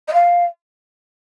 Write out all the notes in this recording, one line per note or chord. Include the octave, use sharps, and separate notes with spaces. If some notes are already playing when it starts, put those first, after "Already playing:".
D#5
F5